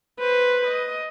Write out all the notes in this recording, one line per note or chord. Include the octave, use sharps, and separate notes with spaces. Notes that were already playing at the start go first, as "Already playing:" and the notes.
B4 C5
D#5